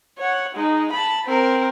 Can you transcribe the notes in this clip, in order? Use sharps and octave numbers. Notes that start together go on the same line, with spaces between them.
C#5 F#5
G#3 D#4
A5 B5
C4 A#4